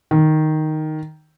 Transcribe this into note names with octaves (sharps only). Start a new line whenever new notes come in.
D#3